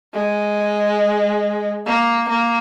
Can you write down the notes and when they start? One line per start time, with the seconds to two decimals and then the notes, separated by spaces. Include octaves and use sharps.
0.13 G#3
1.86 A#3
2.29 A#3